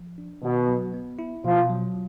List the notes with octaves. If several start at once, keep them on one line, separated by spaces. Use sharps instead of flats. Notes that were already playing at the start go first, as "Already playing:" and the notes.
Already playing: F3
D4
B2 D#3
F#3
B3
E4
B2 F3
F#3